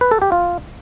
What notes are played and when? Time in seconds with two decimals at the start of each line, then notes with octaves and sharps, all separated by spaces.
0.01 B4
0.11 A4
0.22 G4
0.32 F4